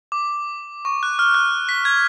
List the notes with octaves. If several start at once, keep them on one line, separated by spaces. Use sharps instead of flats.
D6
C#6
F#6
F6
F#6
B6
G#6